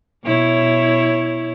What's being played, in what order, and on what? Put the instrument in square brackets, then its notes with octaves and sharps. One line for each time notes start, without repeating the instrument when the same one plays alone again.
[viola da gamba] B2 E4 C#5